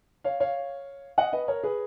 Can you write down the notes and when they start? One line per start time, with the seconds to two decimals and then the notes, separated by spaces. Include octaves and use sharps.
0.24 C#5 F5
0.40 C#5 F5
1.18 D#5 F#5
1.33 B4 D#5
1.48 A#4 C#5
1.63 G#4 B4